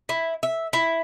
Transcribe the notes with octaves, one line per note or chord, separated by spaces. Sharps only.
E4
E5
E4